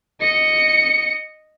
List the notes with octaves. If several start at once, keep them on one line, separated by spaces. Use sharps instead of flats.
D#5 C#7